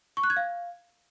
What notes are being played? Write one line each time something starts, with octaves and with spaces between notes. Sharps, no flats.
C#6
F#6
G#6
F5